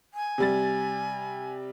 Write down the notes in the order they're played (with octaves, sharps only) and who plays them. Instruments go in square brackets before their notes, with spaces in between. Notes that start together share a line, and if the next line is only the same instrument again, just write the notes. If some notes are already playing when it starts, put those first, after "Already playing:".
[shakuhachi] G#5
[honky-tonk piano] C3 G3 A6